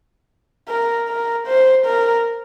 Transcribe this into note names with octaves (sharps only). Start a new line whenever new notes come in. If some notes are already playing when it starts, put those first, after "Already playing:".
A#4
A#4
C5
A#4